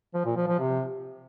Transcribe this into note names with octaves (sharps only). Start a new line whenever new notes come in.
F3
A#2
F3
F3
C3